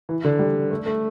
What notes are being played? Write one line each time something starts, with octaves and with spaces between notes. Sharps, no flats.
E3
D3
G3
A3
A3